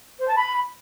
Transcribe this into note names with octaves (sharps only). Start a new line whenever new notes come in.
C5
A5
B5